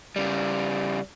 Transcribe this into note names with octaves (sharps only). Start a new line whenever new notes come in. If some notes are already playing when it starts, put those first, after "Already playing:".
C#3 G3